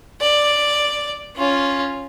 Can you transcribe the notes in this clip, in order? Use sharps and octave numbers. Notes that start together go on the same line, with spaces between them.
D5
C#4 F4